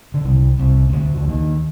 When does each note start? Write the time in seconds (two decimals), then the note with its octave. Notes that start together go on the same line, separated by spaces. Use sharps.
0.14 D3
0.24 C2 C3
0.59 C2 C3
0.90 C3
0.93 D2 D3
1.17 D3
1.28 D#2 D#3